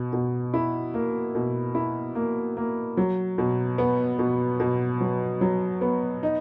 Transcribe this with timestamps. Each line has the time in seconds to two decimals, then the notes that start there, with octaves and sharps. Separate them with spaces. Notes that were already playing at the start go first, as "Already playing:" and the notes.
Already playing: B2
0.13 B2
0.54 E4
0.94 A#3
1.35 B2
1.75 E4
2.15 A#3
2.57 A#3
2.97 F#3
3.38 B2
3.78 B3
4.19 B2
4.60 B2
5.01 F#3
5.41 F#3
5.81 B3
6.23 D#4